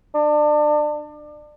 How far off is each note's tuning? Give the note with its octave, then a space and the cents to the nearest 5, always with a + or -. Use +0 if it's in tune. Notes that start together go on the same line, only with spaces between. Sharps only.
D4 +30